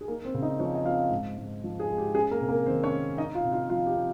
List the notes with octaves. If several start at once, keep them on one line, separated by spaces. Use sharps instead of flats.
G#4
A#3 D#4 A#4
C4 C5
C#3
D#4 D#5
F3 C#4 C#5
D#5
C4 F4 F5
G#2
G#2
F3
G#4
G#3
G4
G4
C#4 G#4
A#3 A#4
C3
A#3 A#4
D#3 C4 C5
C#4 C#5
A#3
D#4 D#5
F4 F5
C3
F4 F5
F3 F4 F5
G4
C4